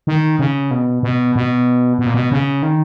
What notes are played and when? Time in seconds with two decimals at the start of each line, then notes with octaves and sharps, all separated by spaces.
0.07 D#3
0.39 C#3
0.71 B2
1.03 B2
1.36 B2
1.99 B2
2.06 A#2
2.14 B2
2.31 C#3
2.63 D#3